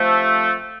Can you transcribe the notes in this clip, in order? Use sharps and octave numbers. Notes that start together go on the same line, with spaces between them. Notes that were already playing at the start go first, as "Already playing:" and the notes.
Already playing: C3 F3 A3